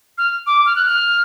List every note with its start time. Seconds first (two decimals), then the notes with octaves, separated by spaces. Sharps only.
0.18 F6
0.47 D6
0.66 F6
0.76 F#6
0.86 F6